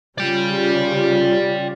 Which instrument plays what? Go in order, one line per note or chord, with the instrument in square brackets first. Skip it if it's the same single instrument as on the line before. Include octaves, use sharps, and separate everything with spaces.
[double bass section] C#3 [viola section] G3 F4 [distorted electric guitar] D5 G5